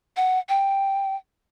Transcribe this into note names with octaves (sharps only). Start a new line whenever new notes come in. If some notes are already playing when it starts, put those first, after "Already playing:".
F#5
G5